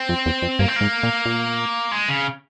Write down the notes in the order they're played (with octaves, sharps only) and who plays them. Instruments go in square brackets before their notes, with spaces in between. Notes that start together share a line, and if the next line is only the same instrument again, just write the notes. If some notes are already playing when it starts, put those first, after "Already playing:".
Already playing: [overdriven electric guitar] C4
[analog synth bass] F2
E2
F2
[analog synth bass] G2 [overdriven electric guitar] A#3
[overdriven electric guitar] C4
[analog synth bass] G#2 [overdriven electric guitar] A#3
[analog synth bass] A#2
A#2
[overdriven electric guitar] G#3
C#3